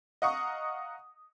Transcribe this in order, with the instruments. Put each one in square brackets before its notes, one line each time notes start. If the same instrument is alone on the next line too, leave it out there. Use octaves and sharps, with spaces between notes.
[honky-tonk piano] D#5 F5 F#5 A#5 C#6 D#6